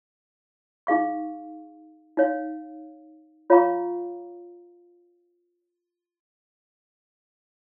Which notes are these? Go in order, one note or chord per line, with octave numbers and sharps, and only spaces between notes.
D#4 G#4 F5 C#6
D#4 C#5 F5
F4 C#5 F5 A#5 C#6